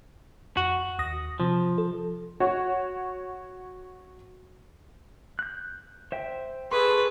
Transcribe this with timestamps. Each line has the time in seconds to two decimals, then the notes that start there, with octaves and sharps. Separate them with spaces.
0.57 F2 F#4
0.99 D#2 D#6 A#6
1.40 C3 F3
1.78 A4
2.40 F#4 C#5
5.39 F#6 G6
6.12 C5 E5 G5
6.72 G#4 A4 B4 C6 C#6 D#6